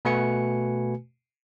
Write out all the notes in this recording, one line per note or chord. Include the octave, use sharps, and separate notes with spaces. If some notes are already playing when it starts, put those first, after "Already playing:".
B2 A3 F#4 B4 G#5 C#7